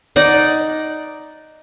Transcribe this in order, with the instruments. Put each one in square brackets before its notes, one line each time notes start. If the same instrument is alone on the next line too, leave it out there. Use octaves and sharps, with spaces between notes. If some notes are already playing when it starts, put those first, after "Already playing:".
[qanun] D#4 D5 F#5